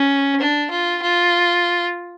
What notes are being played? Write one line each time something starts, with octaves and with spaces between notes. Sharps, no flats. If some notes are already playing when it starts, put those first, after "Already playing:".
Already playing: C#4
D4
F4
F4